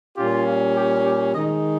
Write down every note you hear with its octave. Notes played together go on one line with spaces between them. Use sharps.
A#2 G3 C#4 F4 G4
F4
G4
G4
D#3 G#3 D#4 D#5